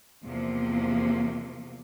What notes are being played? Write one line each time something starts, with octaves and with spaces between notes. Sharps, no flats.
E2 C3 F3 A#3